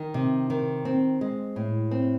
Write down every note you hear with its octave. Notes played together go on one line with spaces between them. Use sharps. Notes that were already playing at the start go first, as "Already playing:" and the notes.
Already playing: D#3
C3
D#3
C4
G#3
A2
C4